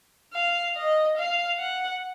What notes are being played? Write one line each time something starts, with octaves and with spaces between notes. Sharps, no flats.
F5
D#5
F5
F#5